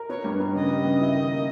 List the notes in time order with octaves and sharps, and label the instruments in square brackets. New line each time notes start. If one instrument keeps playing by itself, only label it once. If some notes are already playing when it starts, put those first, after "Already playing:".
Already playing: [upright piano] A#4
[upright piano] B3 [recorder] C#5
[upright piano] G2
B3
[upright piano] C#3 [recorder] D#5
[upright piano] G3
C#3
E4
D#3
A#3